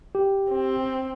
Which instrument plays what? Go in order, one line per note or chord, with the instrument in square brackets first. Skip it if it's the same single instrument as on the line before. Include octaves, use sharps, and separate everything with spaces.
[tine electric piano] G4
[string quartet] C4